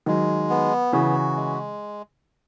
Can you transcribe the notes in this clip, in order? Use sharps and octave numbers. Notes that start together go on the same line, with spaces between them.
D#3 F#3 G#3
B3
C#3 E3 F#4
G#3